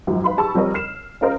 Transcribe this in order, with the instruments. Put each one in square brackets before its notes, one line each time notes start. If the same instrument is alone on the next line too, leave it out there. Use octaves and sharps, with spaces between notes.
[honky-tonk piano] G#1 F#2 F3
B4 F5 B5 C6
G4 G#4 A5 B5 C#6 E6
F3 G3 C4 A#4 C#5 D#5
F6 C7 E7
C#4 F4 G#4 A#4 C5 D#5